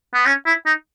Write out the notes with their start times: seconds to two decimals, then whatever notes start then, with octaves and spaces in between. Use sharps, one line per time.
0.14 B3
0.26 C#4
0.46 E4
0.66 D#4